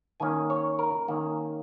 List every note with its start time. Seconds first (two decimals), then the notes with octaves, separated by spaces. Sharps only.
0.20 D#3 A#3 C#4 G#5
0.50 C#5
0.79 A#4
1.08 D#3 A#3 C#4